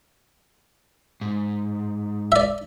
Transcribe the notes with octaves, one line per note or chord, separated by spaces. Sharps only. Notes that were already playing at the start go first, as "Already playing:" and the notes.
G#2
D5 E5